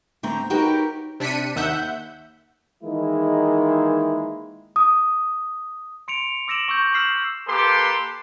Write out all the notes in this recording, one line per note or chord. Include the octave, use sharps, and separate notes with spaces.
D3 A3 C4 A#5
D#4 F#4 G4 A#4 B4 C#5
C3 D4 B6 C#7 D#7
D#2 E5 F#5 G6
D#3 E3 G#3 A#3 D#4 E4
D#6
C6 C#7 D7 F7
D6 E6 A#6 D7 E7 F#7
C#6 E6 G6
E6 F6 B6 C7 E7 F#7
A#3 G4 A4 B4 C6